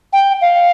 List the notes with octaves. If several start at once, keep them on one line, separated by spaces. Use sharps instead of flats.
G5
F5